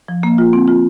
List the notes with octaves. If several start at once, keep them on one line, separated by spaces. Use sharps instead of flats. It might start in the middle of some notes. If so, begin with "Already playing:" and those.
F3
A#3
F4
C4
F4